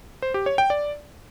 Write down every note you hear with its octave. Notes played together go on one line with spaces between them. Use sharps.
C5
G4
C#5
G5
D5